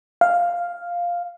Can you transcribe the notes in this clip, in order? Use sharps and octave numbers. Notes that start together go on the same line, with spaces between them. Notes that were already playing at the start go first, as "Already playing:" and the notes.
F5